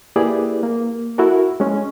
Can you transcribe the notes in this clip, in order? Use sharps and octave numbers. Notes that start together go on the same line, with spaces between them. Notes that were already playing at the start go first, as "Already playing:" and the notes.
A#3 E4 G4 G#4 B4 D5
A#3
E4 F#4 A4 A#4
G#3 C#4